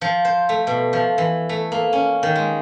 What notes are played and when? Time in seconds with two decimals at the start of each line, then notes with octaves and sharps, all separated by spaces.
0.01 F3
0.25 C5
0.49 A3
0.67 B2
0.93 F3
1.18 E3
1.49 A3
1.72 A#3
1.93 C#4
2.23 D#3
2.35 G#3